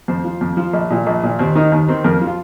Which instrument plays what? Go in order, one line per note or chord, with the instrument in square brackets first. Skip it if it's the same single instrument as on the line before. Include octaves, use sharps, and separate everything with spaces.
[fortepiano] F2 C5
F3
F2
F3
A#1
A#2 F3
A#1
A#2 F3
D#2 C4
D#3 D#4
D#2 D#4
D#3 C4
F2 A#4
F3
F4